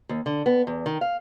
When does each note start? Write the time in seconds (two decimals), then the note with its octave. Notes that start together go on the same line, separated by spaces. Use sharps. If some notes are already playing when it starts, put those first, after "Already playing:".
0.09 D#2
0.26 D3
0.46 B3
0.67 E2
0.86 D#3
1.01 F5